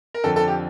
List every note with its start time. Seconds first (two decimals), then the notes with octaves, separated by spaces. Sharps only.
0.14 A#4
0.24 F2 D3 F3 A4
0.36 A4
0.48 G4